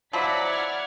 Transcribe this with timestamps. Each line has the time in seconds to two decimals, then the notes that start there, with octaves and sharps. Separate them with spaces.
0.13 F3 F#3 E4 D5 F#5 A#5 A6 B6
0.46 E5 F6 G#6